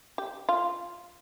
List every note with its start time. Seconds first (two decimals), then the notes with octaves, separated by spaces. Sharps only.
0.18 G4
0.49 F4